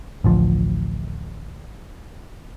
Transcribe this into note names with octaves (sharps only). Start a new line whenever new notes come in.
A1 D2 F3